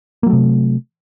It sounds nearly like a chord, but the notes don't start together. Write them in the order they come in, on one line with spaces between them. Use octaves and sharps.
A#3 F#3 A3 C3